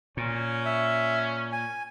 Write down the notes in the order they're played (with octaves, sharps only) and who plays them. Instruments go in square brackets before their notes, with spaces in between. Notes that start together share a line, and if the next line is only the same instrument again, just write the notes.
[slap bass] A#2 [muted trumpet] C#4
[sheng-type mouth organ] E5
G#5